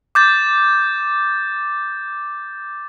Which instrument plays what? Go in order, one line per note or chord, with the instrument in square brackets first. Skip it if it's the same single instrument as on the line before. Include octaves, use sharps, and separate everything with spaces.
[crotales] D6 G6 A6